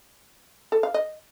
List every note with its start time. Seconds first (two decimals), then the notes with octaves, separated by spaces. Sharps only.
0.72 A4
0.83 F5
0.94 D#5